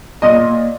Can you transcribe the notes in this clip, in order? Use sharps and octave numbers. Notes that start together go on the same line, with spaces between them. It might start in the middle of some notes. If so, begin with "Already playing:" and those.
A#2 D#5